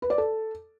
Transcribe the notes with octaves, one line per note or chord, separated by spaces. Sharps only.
B4
D5
A4